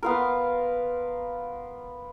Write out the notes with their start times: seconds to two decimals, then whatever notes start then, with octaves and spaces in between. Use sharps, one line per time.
0.03 B3 F4 A#4